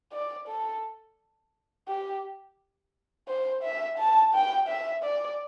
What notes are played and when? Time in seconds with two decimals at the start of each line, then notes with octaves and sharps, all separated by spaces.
0.12 D5
0.48 A4
1.88 G4
3.28 C5
3.63 E5
3.98 A5
4.34 G5
4.68 E5
5.04 D5